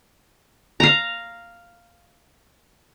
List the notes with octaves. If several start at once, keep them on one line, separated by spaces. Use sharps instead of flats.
F5 A#5